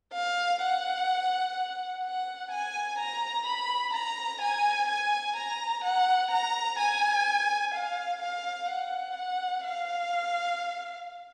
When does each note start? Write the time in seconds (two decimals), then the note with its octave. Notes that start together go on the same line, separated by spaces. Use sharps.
0.13 F5
0.62 F#5
2.04 F#5
2.51 G#5
2.99 A#5
3.46 B5
3.94 A#5
4.41 G#5
4.89 G#5
5.36 A#5
5.84 F#5
6.31 A#5
6.79 G#5
7.74 F5
8.22 F5
8.69 F#5
9.17 F#5
9.64 F5